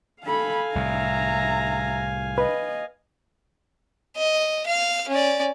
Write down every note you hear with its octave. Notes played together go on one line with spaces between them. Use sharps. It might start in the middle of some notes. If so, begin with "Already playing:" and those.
A4 F5 G#5 B5
C2 A2 E5 A#5
B4 D#5
D#5
F5 F6
C#4 D5